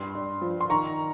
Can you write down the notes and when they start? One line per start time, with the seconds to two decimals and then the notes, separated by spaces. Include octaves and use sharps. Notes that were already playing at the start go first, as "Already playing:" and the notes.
Already playing: G2 C6
0.15 G2
0.42 F3
0.61 C6
0.70 D#3 A#5 C#6